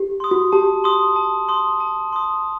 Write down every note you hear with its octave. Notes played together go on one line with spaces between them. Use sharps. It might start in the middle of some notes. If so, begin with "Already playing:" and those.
Already playing: G4
C6 D#6
F#4
G4 A5
C6 D#6
A5
C6 D#6
A5
C6 D#6